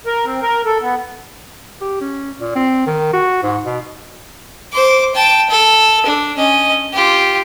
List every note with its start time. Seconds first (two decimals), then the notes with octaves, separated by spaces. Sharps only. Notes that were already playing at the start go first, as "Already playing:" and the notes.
0.06 A#4
0.26 C4
0.42 A#4
0.66 A4
0.81 B3
1.81 G4
2.01 C#4
2.40 A#2
2.55 C4
2.87 D#3
3.13 F#4
3.43 G#2
3.65 B2
4.73 C5 D6
5.14 G5 A5
5.50 A4
6.06 D4
6.36 C#4 D#5
6.93 F4 G4